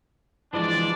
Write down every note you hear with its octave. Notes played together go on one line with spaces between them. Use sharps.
E3 F3 G#3 D4 D5